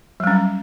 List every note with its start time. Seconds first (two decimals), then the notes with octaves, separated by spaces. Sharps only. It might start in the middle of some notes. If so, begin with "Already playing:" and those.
0.20 F#3
0.24 G3
0.27 C#4